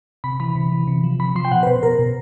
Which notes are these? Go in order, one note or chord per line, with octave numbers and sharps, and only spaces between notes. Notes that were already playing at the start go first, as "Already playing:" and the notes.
C3 B5
E3 B5
C3
E3
C3
F3
C3 B5
F3 C6
G5
B2 F#5
B4
B2 C5
B2 A#4
B2